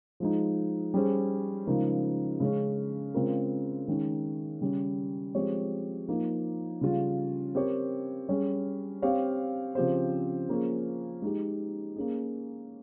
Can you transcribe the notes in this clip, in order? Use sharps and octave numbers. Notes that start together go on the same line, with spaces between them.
F3 G#3 D#4
G3 C#4 G#4 C5
C#3 F3 G#3 D#4 A#4
C#3 G#3 C#4
C#3 G#3 C4 F4 A#4
D#3 G#3 C#4
C#3 G3 C#4
F3 G#3 C4 G4 C#5
F3 A#3 D#4
C#3 G3 C#4 F4
C4 G4 A#4 C#5
G3 C#4 G#4 C#5
C4 G4 C#5 F5
C#3 F3 C4 G4 C5
F3 A#3 C#4 G#4
G#3 D#4 G4
A#3 C#4 G#4